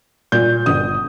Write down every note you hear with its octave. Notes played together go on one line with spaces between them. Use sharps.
A#2 G6
G1 D#6